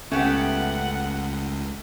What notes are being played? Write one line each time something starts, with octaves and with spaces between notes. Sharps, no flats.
C#2 A3 B3 C#4 G4 F#5